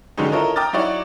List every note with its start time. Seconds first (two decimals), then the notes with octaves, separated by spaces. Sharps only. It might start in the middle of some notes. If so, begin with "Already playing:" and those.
0.18 D3 D#3 F#3 G#3 C#4 D#4
0.32 E4 F4 A4 A#4 C#5 D#5
0.56 G5 A#5 D6 D#6 F6 A6
0.73 F#3 D#4 E4 F#4 C#5 D5